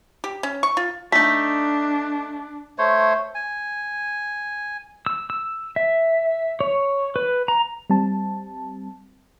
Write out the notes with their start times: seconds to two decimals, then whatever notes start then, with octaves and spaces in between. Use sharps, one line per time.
0.24 G4
0.43 C#4
0.63 C#6
0.77 F4
1.12 A3 D4 D#4 B6
2.78 A3 C5 C#5
3.35 G#5
5.06 E6
5.30 E6
5.76 E5
6.60 C#5
7.16 B4
7.48 A#5
7.90 G3 C4 A5